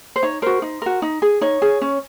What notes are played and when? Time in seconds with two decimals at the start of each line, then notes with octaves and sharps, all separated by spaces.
0.16 C5
0.23 D#4 C#5
0.42 F#4 A#4 C5
0.62 D#4
0.82 F#4 A#4
1.02 D#4
1.22 G#4
1.41 D#4 C#5
1.62 G#4
1.81 C#4